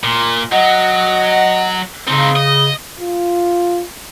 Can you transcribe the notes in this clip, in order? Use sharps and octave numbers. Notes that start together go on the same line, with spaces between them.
A#2
F#3 D#5 F#5
C#3 C4 D#4
D#5
F4